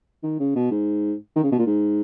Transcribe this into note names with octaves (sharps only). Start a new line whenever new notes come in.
D#3
C#3
B2
G#2
D#3
C#3
B2
A#2
G#2